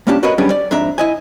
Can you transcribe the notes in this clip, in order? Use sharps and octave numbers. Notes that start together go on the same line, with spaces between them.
C2 A#3 C#4 D4 G4 A5
F#4 A#4 B4 C#5 D#5 F#5
F#3 G3 B3 C#4 D4 G#4
D5
F2 G#2 D4 E5 A#5
E4 D#5 G#5